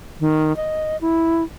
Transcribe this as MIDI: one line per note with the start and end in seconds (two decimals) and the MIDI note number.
0.20 0.55 51
0.56 0.97 75
1.01 1.43 64